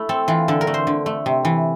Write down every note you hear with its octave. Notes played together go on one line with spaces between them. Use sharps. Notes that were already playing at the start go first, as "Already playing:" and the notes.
Already playing: A3 E4
C4 A4
E3 F4
D3 A4
A#4
A3
C5
D3
A3
C3
E3